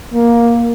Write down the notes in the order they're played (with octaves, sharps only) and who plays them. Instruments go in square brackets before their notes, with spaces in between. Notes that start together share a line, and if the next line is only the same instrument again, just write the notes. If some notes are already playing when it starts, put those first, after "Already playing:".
[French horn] A#3